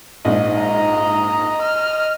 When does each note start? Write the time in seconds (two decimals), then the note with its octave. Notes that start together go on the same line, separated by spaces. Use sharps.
0.25 A#1 G#2 D#5
0.61 A#5
1.62 F6